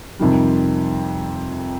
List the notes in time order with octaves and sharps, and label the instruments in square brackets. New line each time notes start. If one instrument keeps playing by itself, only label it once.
[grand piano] F2 C3 D#3 G3